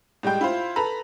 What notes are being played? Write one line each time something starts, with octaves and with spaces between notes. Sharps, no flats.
A2 G3 G#3 G5 G6
E4 F4 C5
A4 B4 A#5 B5